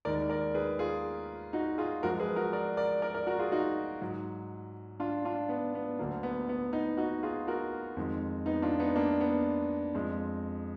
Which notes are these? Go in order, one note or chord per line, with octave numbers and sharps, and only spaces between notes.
D#2 D#3 G#3 A#4 D5
A#4 D5
G#4 B4
F4 G#4
D#4 F#4
F4 G#4
F#2 F3 G#3 F#4 A#4
G#4 B4
F#4 A#4
A#4 D5
A#4 D5
A#4 D5
A#4 D5
F#4 A#4
F4 G#4
D#4 F#4
G#2 F#3
D4 F4
D4 F4
B3
B3
D2 D3 F#3 A#3
B3
B3
B3 D#4
D#4 F#4
F4 G#4
F#4 A#4
F2 D#3 G#3
B3 D#4
D4 F4
B3 D#4
A#3 D4
B3
F2 F3 G#3